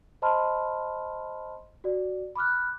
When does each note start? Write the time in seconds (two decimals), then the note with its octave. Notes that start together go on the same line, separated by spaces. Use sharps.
0.22 C5 D#5 A5 B5 C6 F6
1.84 F#4 D5
2.36 B5 D6 F6 F#6